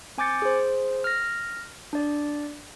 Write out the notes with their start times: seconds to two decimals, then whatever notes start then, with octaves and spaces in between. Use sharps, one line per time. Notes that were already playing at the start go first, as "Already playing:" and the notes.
0.18 C4 G#5 D6 G6 A6 C#7
0.42 G#4 C5
1.04 F6 A#6
1.93 D4 D5